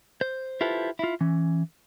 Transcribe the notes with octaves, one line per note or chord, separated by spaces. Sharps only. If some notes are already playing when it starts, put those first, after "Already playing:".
C5
E4 F4 G4 A4 B4 C5
E4 F4
E3 C#4